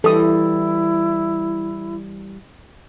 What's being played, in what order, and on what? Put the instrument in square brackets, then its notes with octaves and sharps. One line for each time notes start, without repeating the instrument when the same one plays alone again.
[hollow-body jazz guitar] E3 G3 [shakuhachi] E4 [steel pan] A4 D#6